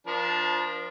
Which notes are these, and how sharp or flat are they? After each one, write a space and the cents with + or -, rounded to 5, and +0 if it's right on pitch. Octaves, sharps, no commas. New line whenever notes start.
F3 +0 D4 +0 A#4 +40